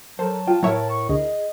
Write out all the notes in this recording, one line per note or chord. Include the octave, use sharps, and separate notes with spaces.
F#3 A4 A#4 C5 A5
F4 G5
A2 F#3 E4 A#4 C#5 E5
C#6
D2 G#4 D#5